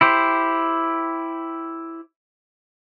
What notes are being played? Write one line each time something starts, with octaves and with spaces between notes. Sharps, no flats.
E4 G4 C5